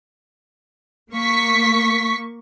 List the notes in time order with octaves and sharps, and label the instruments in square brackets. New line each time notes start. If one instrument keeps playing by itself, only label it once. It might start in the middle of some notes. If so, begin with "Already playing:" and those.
[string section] A#3 C#6 B6